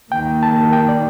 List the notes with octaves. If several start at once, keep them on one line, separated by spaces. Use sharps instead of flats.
D#2 D#3 A#3 G5
A5
G5
D5